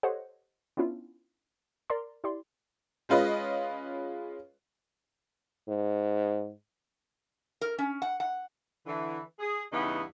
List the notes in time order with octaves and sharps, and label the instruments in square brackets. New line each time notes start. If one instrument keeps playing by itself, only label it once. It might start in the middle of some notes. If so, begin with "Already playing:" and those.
[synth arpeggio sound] G4 A4 C5 C#5 D#5 F#5
B3 C#4 D4 E4 F4
A#4 D5 A#5 C6
E4 G4 D5 C6
[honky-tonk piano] G#3 C#4 F4 B4 D#5
[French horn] G#2
[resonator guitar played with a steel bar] A#4
C#4
F#5
F#5
[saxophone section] D3 E3
G#4
E2 G2 C#3 E3 B3 D#4